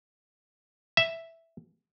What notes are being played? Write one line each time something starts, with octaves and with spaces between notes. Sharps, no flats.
E5